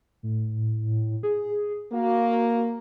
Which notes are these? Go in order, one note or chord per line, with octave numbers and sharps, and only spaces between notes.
A2
G#4
A#3 F#4